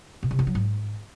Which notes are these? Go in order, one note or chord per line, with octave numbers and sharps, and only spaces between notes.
B2
C3
B3
F#3
G#2